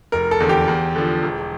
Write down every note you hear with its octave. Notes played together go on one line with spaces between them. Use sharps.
F1 A#4
A4
E2 D3
G4
E2
D3 F3
E1